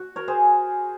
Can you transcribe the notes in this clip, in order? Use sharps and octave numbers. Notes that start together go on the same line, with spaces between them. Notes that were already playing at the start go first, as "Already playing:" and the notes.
Already playing: F#4
A#4 C#5
G#4 C5